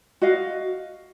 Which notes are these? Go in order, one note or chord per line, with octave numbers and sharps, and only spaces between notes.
F#4 D#5 F5